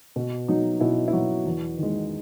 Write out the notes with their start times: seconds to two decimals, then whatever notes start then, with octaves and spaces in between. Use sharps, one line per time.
0.16 B2
0.48 F#3 D#4
0.80 B2 E4
1.08 E4
1.13 F#3 F#4
1.46 E2
1.78 D#3 G#3